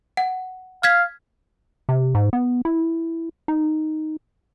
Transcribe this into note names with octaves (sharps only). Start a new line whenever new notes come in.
F#5
F5 F6 G#6 B6
C3
G#2
B3
E4
D#4